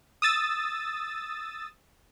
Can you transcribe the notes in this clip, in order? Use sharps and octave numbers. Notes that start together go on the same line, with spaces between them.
D#6 E6 A6